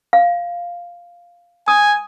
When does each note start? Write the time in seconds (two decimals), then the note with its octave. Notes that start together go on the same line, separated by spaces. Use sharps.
0.13 F5
1.68 G#5 D#6